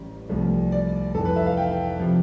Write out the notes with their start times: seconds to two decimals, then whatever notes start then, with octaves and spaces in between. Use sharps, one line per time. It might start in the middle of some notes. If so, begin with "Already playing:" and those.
Already playing: A1 A2 G3
0.29 C2 C3 F3 A3
0.72 D5
1.14 F1 F2 E3 A4
1.25 B4
1.36 E5
1.46 F5
1.57 G5
1.99 C3 F3